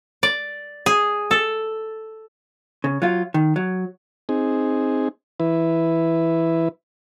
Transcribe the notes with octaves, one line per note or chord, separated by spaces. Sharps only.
D5
G#4
A4
C#3
F#3 F4
D#3
F#3
C4 D#4 G#4
E3 E4 B4